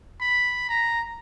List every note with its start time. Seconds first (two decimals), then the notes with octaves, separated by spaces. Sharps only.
0.20 B5
0.69 A#5